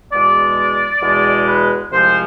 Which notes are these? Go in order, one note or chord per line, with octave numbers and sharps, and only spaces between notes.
E2 B2 G#3 D5
E2 B2 G#3
B4
C2 C3 F3 G#3 C5